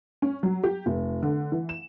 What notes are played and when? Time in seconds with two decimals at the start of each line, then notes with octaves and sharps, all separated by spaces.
0.22 C#4
0.43 F#3
0.64 G4
0.86 F1
1.23 D3
1.52 E3
1.69 E7